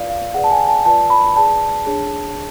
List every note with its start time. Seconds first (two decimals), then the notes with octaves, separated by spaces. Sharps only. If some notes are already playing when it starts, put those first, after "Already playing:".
Already playing: F4 B4 D5 F5
0.10 F5
0.34 G#4 B4 D5 F#5
0.44 A5
0.51 G#5
0.68 A5
0.85 F4 B4 D5 A5
1.10 B5
1.36 G#4 B4 D5 A5
1.86 D4 G#4 C#5